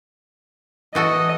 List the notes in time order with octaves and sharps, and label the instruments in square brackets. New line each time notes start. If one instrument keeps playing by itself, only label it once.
[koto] E3 F#4 A4 [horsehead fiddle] D#5